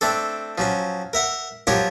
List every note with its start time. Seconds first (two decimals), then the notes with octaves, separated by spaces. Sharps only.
0.01 A3 C4 D4 A4
0.58 F3 F#3 C#4
1.13 A#4 E5 F#5
1.67 F3 F#3 F4 G4 A#4 C#5